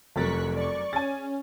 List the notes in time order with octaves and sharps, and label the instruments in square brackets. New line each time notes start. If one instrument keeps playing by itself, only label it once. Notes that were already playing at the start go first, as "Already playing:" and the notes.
[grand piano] F1 A6 [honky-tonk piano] F#2 F#3 A#4 [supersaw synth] C#6 F#6 B6
[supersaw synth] D5 C#6
[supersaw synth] C#4 [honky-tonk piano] G#4 G#5 [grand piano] A6